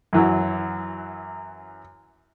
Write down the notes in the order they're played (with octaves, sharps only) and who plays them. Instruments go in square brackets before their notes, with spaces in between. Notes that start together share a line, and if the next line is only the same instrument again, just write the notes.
[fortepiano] F#2 E3 F#3